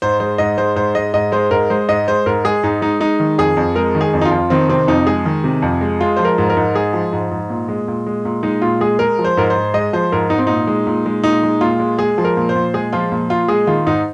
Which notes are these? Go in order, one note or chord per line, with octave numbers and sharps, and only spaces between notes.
G#2 C5
G#3 C5
G#2 D#5
G#3 C5
G#2 C5
G#3 D#5
G#2 D#5
G#3 C5
G#2 A#4
G#3 C5
G#2 D#5
G#3 C5
G#2 A#4
G#3 G#4
G#2 D#4
G#3 D#4
G#3 D#4
D#3
F2 G#4
F2
G#3 A#4
D#3
G#4
F2
D#4
F4
F2
D#3 C4
C3 C4
F2 D#4
G#3 G#4
D#3
C3
F2
G#3
G#3 F4
F3 C5
A#4
G#2
A#4
G#2
G#3 G#4
F3
G#2
G#2
A#2
G#3
A#2
G#3
A#2
G#3 D#4
A#2 F4
G#3 G#4
G#3 A#4
F3
C5
G#2 A#4
C5
G#2
G#3 D#5
F3 C5
G#2 A#4
G#2 D#4
C4
A#2 D#4
G#3
A#2
G#3
A#2 D#4
G#3
A#2 F4
G#3
G#3 G#4
F3
A#4
A#2
C5
A#2
G#3 G#4
F3 F4
A#2
A#2 F4
G#3 G#4
D#3 F4
G#2 D#4